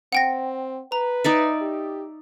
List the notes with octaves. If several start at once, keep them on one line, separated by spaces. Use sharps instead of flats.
C4 F#5 G5 A#6
B4 A#5
D#4 D5 E5
G4